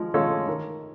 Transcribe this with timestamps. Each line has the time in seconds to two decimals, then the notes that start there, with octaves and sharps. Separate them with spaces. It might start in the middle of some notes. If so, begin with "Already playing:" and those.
Already playing: F3 G#3
0.14 G#3 C#4 F4 A4
0.48 D#3